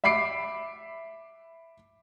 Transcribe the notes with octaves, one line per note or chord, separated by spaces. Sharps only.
E5 B5 D6 C7 D7